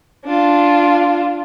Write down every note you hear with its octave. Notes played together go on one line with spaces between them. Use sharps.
D4 F4